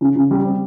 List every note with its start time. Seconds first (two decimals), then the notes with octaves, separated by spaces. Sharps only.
0.01 C#3
0.16 C#3
0.31 G3
0.45 C4